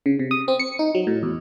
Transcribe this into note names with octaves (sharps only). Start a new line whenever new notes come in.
C#3
C3
D#6
C4
C#7
D#4
F#3
A2
E2